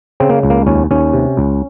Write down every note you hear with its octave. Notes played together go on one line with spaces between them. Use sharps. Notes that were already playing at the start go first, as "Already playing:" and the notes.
C#3 C4
A#3
C#2
A#3
D#2 C#4
D#2 C#4
C3
C#2